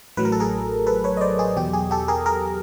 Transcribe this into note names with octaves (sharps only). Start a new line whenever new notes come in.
A1 A2 F#3 B4
A#4
A4
G#4 A#4
A4 B4
B4 C#5
D#5
C5 D5
G#4
E2 B2 F#3 G4
G#4
G4 A4
G#4 A#4
G#4 A#4